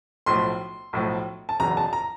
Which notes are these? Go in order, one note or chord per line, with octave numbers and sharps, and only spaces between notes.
B1 A2 F3 C6
B1 A2 F3
A5
F#1 E2 B2 A#5
A5
A#5